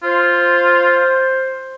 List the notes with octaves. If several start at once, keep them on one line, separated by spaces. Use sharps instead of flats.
F4 C5